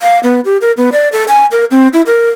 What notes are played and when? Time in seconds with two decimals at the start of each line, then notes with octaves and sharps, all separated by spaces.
0.02 F5
0.23 B3
0.45 G4
0.61 A#4
0.77 B3
0.92 D5
1.12 A4
1.28 G#5
1.52 A#4
1.71 C4
1.93 E4
2.07 A#4